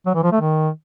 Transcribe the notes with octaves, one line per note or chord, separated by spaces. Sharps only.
F#3
E3
F3
A3
D#3